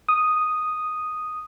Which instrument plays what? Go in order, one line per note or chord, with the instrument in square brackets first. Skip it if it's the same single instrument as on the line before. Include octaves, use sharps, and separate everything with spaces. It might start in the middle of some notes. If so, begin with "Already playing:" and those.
[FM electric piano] D#6